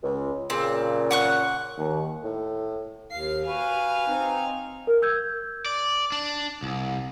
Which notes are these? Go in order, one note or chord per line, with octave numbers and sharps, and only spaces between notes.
C#2
A#2 C#3 C4
F#5 C#6 F#6
D#2
A2
D#2 F5 C7
F#4 B4 F5 G#5
C4 D#4
A#4
E6 G6 G#6
D5
D4
C2